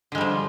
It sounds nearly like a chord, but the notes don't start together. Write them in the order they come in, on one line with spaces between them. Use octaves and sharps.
D3 G#3 G3 F3